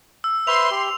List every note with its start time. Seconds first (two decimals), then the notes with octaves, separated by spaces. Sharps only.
0.24 E6
0.47 B4 C5 E5 C6 F7
0.71 G4